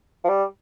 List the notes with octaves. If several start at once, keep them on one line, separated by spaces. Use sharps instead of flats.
F3
G3